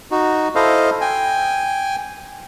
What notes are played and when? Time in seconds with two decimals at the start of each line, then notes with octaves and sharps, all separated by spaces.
0.11 D#4 F#4
0.55 E4 A4 C5 D#5 F5
1.01 G5 G#5